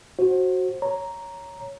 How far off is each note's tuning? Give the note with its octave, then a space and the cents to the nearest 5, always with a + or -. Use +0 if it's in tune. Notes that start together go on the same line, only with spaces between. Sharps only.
F#4 +0 C5 +25
C#5 +5 A#5 +0